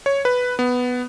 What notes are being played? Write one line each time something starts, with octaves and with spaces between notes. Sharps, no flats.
C#5
B4
B3